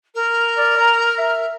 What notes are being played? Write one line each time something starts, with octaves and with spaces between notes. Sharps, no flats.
A#4
D5
A#5
E5